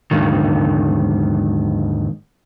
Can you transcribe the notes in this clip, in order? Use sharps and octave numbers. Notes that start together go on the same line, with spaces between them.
D#2 G#2 D3 D#3